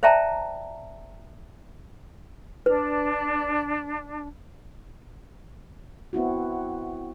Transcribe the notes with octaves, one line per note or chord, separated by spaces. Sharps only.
C5 D5 E5 G5 A5 A#5
D4 B4
B3 C4 E4 F#4